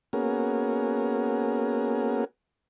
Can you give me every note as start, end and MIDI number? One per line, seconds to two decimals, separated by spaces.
0.13 2.25 58
0.13 2.25 59
0.13 2.25 61
0.13 2.25 66
0.13 2.25 68
0.13 2.25 70